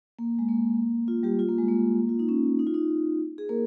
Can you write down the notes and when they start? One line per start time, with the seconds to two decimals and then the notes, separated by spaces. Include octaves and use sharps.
0.19 A#3
0.39 G#3
0.49 A#3
1.08 F4
1.23 G3 G4
1.39 F4
1.49 A#3
1.58 G#3
1.68 A#3
2.09 F4
2.19 D#4
2.29 C#4
2.59 D#4
2.67 F4
2.74 D#4
3.38 G#4
3.49 A#3 A#4